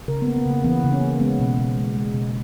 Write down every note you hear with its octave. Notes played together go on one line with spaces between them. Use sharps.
C#3 A#4
B3
A#3
B3
C#3 A#3
E3 B3
C#3
C#4
A#3
G#3 B3
B2
B2
G#3
G#3
B2